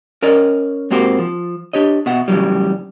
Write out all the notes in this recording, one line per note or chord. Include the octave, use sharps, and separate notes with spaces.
C#4 A#4 D5 D#5
G#2 A#3 C4 F#4 G4
F3
D4 G4 C#5 D#5
B2 E5 F#5
A2 C#3 E3 F#3 G3